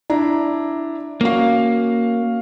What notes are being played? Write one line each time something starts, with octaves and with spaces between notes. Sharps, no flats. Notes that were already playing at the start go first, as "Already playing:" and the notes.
D4 E4 A#5
A#3 C#4 F#4 F5